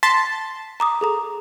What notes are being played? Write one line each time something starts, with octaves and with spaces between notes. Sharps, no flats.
A5 C6 A#6 B6
A#5 D6 D#6
G#4 A4 A#5